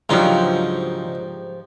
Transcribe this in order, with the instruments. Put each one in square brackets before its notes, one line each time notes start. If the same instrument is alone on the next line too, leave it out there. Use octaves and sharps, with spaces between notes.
[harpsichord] C#2 D#4 [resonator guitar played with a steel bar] G#2 F3 G4 [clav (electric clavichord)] F#3 D4 F5